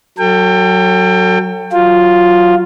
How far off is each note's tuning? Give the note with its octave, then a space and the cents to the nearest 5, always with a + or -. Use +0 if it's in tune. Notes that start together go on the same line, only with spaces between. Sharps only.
F#3 +0 A4 +35 G5 +25
F#3 +0 F4 +0